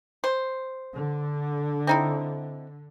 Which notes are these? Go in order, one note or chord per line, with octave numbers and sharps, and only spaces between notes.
C5
D3
C4 D#4 E4